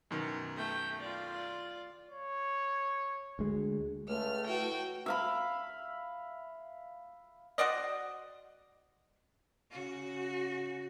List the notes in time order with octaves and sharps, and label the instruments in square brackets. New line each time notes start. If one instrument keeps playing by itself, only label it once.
[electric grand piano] F#2 B2 D#3
[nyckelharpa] A3 G5
F4 D5
[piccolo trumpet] C#5
[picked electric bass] D2 G#3
[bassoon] C#2 [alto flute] A3 [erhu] F6
[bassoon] E3 [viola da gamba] F#4 [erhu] G5
[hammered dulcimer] E5 F5 B5
[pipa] F#4 C5 D5 D#5
[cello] C#3 F#4